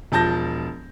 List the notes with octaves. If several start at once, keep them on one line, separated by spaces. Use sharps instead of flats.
E1 F3 A5 G6 A#6